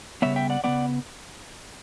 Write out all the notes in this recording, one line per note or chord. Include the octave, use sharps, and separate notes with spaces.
C#3 G3 B3 C#5 E5
E5 G5
D5 F#5
C#3 G3 B3 D5 F#5